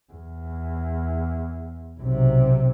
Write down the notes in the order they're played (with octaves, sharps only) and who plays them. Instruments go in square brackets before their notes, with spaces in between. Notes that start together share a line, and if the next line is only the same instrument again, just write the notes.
[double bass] E2
B1 C3